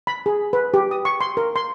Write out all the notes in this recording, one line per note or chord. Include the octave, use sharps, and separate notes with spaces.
B5
G#4
B4
G4
D#6
C#6
C6
A#4
C6